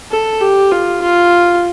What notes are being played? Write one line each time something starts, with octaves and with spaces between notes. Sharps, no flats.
A4
G4
F4
F4